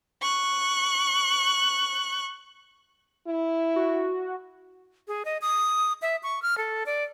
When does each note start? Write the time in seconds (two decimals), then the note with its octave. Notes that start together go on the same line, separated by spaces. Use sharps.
0.22 C#6 F#6
3.27 E4
3.76 F#4
5.08 G#4
5.25 D#5
5.42 D#6
6.02 E5
6.23 C#6
6.42 F6
6.58 A4
6.86 D5